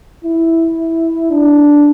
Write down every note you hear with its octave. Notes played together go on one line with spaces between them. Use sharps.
E4
D4